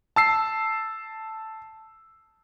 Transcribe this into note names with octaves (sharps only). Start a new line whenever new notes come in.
A5 E6 C7